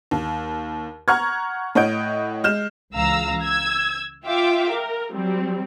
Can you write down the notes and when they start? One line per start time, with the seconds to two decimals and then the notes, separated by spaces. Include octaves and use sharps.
0.11 D#2
1.08 F#5 A#5 C#6 F6 G#6
1.75 A2 C#5 D#5 F#5 G6 D7
2.44 G#3 F6 G6 E7
2.93 C#2 E3 F5 A#5 E6
3.43 E6 G#6
4.25 F4 E5 F5 G5 D6
4.72 A#4
5.12 F#3 G3 C4